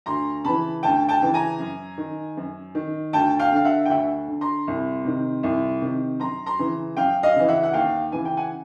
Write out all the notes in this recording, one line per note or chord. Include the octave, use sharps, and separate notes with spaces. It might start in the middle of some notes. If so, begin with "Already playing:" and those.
D2 A#5 C6
C#3 E3 A5 B5
D2 G5 A5
G5 A5
C#3 E3
G#5 A#5
F#2
D#3
F#2
D#3
D2 G5 A5
F5 G5
D3 F5
E5 F#5
G5
D2 E5 F#5
D3
A#5 C6
C2
C3 D#3
C2
C3 D#3
F#2 A#5 C6
A#5 C6
C#3 E3
F#2 F5 G5
D#5 F5
C#3 E3
E5 F#5
F#5
D#2 F5 G5
C#3 E3 G#5
G5
F#5 G#5